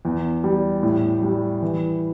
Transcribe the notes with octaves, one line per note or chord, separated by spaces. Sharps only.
E2
G3
A2
G3
E3